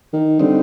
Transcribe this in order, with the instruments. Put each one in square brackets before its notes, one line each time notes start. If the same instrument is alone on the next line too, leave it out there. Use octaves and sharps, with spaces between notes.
[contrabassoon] D#3
[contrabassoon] D3 [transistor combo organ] G3 C4 D#4